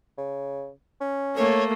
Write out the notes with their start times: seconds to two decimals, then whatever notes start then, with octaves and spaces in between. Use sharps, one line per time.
0.18 C#3
1.01 C#4
1.37 A3 A#3 C#5